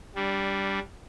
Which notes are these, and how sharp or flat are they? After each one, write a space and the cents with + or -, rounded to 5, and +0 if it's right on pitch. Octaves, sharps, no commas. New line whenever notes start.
G3 +0 D4 -15